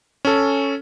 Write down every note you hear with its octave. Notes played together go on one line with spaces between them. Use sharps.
C#4 A4